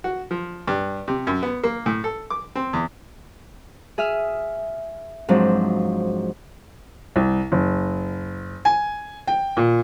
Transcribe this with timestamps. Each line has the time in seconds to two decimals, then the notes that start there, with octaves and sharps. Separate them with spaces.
0.04 F#4
0.31 F3
0.67 G2
1.08 C3
1.27 F#2
1.43 B3
1.63 A#3
1.86 A2
2.04 A4
2.30 D6
2.56 C4
2.73 E2
3.98 G#4 E5 D#6 F6
5.28 G#2 F3 F#3 C4 D4
7.16 C2
7.52 F#1
8.65 G#5
9.27 G5
9.57 A#2